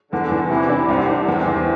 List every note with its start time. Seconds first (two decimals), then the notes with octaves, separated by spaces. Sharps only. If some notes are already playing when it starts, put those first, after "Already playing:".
0.12 E2 D3
0.31 E2
0.50 C3 E3
0.69 D4
0.88 C2 C3
1.09 D4
1.28 E2 C3
1.47 E2